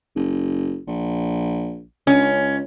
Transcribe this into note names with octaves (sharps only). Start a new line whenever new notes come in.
F#1
A#1
C#2 C#4